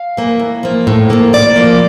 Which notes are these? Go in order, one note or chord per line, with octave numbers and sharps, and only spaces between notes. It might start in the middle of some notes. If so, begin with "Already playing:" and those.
Already playing: F5
E3 A#3
A2
F3 A#3
A2
F3 A#3
A2 D5
F3 A#3